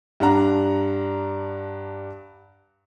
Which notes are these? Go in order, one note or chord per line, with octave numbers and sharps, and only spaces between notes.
G2 D4 F#5 A#5